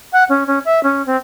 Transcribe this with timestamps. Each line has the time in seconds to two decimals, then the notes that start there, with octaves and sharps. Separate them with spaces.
0.13 F#5
0.29 C#4
0.47 C#4
0.65 E5
0.83 C#4
1.06 C4